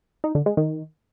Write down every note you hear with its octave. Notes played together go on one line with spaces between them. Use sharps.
D#4
D3
G#3
D#3